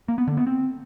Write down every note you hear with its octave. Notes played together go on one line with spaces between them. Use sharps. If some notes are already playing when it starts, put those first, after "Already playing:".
A#3
B3
D3
B3
C4